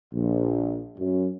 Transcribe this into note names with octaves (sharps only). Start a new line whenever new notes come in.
A#1
F#2